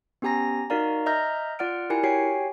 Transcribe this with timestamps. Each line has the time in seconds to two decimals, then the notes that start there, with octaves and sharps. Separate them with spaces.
0.22 B3 C#4 G4 G#5 A#5 A#6
0.70 D#4 F#4 A#4 D5 F5 A#5
1.06 D#5 E5 A#5 F6 G6 A#6
1.59 F4 D5 F#5 F6 D7
1.90 E4 G4 A#4 G#5 C#7
2.03 F#4 G4 C#5 G5 G#5 C7